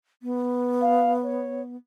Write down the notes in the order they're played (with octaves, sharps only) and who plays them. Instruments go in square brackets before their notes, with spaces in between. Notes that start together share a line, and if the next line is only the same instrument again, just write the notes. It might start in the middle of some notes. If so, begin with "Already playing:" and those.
[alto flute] B3
[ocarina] F5
C#5